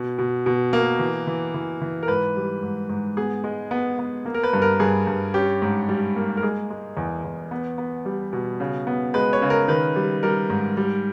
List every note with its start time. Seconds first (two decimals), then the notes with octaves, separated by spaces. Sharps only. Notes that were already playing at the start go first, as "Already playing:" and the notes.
Already playing: B2
0.19 B2
0.46 B2
0.73 A#3
0.99 E3
1.27 E3
1.54 E3
1.82 E3
2.03 A#4
2.08 G#2 B4
2.36 G3
2.63 G#2
2.89 G#2
3.17 B3 G#4
3.44 G#3
3.71 B3
3.99 B3
4.26 A#3
4.34 A#4
4.43 B4
4.53 G2
4.62 A#4
4.80 G2 G#4
5.07 G2
5.34 C#4 G4
5.62 G#2
5.89 G3
6.16 A#3
6.37 A#4
6.43 G#3 G#4
6.70 G#3
6.97 E2
7.24 E2
7.51 B3
7.78 B3
8.05 G3
8.33 B2
8.60 C#3
8.87 B3
9.14 G#3 B4
9.33 C#5
9.42 C#3
9.50 A#4
9.68 D#3 B4
9.96 G3
10.23 G3 A#4
10.50 G#2
10.77 G3